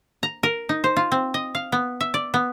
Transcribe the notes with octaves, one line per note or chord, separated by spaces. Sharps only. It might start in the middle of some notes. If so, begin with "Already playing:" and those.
A#5
A#4
D#4
C5
F4
C4
D#5
F5
B3
E5
D5
B3